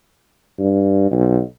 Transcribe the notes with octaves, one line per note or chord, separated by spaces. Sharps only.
G2
B1